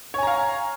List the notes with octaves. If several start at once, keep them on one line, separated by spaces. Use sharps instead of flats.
C#5 F5 G#5 A#5